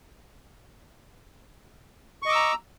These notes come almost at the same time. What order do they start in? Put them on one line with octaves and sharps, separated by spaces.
C#6 D#5 D6 E6 A#5